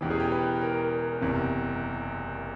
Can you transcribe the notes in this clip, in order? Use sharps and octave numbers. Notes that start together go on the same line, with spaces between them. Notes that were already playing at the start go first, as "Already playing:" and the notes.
E1 E2 C#3 E3 G4
G#4
G4
B4
A#4
F#1 E2 C3